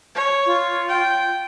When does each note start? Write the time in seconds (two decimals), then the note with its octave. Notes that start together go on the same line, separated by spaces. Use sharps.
0.15 C#5
0.46 F4
0.89 G5